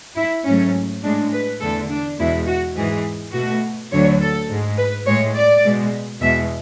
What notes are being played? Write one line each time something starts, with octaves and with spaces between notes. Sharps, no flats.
E4
G#2 F#3 A3 C#4
A2 G#3 D4
B4
E2 D3 A3 A4
D4
E2 B2 G#3 E4
F#4
G#2 E3 G#3 G#4
B2 A3 F#4
D2 D3 F#3 C#5
A4
G#2 G#3
B4
A2 G#3 C#5
D5
B2 G#3
E2 B2 G#3 E5